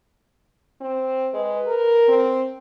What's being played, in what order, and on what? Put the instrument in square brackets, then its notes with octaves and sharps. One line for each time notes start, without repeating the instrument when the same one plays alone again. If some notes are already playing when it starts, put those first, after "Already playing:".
[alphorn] C4
[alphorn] G#3 [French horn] B4
[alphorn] A#4
[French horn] C4